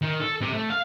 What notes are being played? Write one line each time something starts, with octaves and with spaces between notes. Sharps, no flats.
D#3
A4
C3
A3
F5